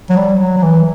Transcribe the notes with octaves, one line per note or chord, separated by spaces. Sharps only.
F#3
G3
F#3
F#3
E3